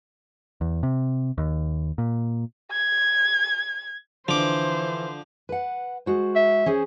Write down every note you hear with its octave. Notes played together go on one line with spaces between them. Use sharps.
E2
C3
D#2
A#2
G#6
D3 E3 F3 C5 D6
B4 F#5
G#3 F#4 C5
E5
C#4 G#4 C5